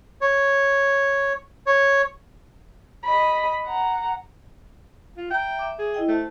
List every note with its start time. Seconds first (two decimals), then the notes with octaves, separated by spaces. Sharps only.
0.21 C#5
1.66 C#5
3.05 D#5 B5
3.67 F#5 A#5
5.18 F4
5.31 E5 G5 A#5
5.59 E5 D6
5.79 G#4
5.94 E4 D#5 G5
6.08 A3 C5 A5